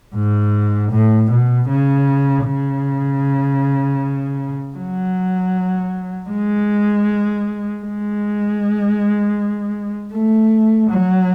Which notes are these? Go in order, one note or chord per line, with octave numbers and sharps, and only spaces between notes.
G#2
A2
B2
C#3
C#3
F#3
G#3
G#3
A3
F#3